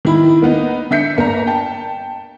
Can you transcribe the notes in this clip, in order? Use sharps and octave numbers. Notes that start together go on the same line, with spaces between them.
D#3 E4 B5
A#3 B3 D#4
D3 E5 G6 B6 C#7
G1 A#3 D4 A#5
G5 A5